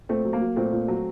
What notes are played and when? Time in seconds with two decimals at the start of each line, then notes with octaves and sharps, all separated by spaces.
0.09 A#2 A3 C4
0.25 F#3
0.33 A#3
0.41 F#3
0.56 A#2 A3 C4
0.72 A#2
0.88 F#3